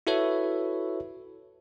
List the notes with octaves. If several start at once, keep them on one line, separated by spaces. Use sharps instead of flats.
E4 F#4 A4 B4 C#5 E5